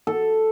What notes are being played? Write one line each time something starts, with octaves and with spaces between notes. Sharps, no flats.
A4